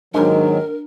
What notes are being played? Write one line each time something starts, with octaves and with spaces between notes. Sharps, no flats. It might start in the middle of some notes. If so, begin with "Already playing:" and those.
D#2 G#2 D#3 F#3 G#3 D4 A#4 A#5